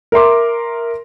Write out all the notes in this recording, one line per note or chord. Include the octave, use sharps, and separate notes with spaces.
A#4 E5 C6 D6